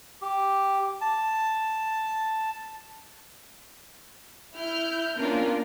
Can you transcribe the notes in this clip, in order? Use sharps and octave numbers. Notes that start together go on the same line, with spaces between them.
G4
A5
E4 F6 G6
A#3 B3 C#4 D4 F4 A#4